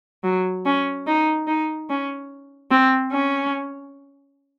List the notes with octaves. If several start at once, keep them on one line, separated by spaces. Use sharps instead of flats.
F#3
C#4
D#4
D#4
C#4
C4
C#4